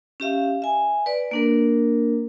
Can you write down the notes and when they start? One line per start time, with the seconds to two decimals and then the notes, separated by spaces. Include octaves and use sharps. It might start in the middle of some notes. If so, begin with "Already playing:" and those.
0.20 C#4 G4 E5 F5
0.62 E5 G#5
1.06 B4 D5
1.31 A#3 D4 A#4